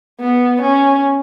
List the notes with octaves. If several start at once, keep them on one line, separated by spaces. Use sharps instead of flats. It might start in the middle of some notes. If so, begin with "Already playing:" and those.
B3
C#4